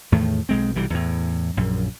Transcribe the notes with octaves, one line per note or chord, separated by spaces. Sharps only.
E2 A2 D#3 A3
B1 G#3 C4
B1 C3 E3 G3
E2 A2
A#1 F#2